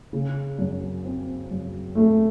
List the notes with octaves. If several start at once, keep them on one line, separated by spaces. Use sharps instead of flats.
C#3
F#2
C4
F#2
A3